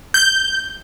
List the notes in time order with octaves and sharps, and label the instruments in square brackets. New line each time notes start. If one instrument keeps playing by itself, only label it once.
[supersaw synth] G6